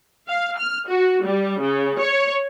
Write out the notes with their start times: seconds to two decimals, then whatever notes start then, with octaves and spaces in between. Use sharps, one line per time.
0.28 F5
0.58 F6
0.88 F#4
1.24 G3
1.61 C#3
1.99 C#5